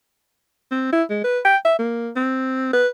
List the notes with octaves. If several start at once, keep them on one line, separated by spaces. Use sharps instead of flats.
C4
E4
G#3
B4
G5
E5
A#3
C4
B4